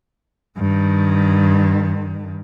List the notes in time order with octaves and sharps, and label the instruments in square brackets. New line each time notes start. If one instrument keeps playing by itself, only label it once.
[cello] G2 D#3